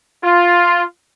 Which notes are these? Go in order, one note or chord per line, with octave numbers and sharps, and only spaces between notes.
F4